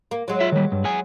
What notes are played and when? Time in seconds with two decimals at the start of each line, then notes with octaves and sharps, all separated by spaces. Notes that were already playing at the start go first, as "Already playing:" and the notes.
0.11 A#3
0.28 F#3 G#3
0.40 F4 E5
0.52 D#3 G3
0.72 G2
0.84 G#4 F#5 G#5